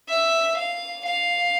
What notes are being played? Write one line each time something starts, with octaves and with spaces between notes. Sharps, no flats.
E5
F5
F5